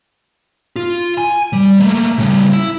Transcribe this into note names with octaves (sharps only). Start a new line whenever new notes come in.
F4
G#5
G3
A3 A#3
C#3 G3
E4